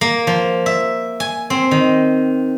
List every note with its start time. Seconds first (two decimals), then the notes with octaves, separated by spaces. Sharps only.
0.01 A#3
0.27 F3
0.66 E5
1.20 G#5
1.50 C4
1.71 D#3